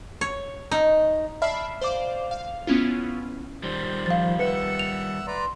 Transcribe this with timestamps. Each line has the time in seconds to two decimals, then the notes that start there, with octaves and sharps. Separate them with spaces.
0.21 C#5
0.71 D#4
1.42 D5 E5 A5 B5 F6 C7
1.81 C5 D5 F5 D6
2.31 F5
2.67 B3 C#4 E4 F4
3.63 D#3 G3 C5
4.06 F3 F5 A6
4.39 B4 E5 F#5 E6 C#7
4.79 F7
5.27 B4 D5 A#5 C6